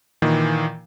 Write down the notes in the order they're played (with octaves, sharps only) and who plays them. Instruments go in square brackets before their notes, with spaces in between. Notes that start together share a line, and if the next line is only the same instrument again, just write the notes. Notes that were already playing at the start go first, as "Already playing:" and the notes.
[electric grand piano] A#2 D#3 E3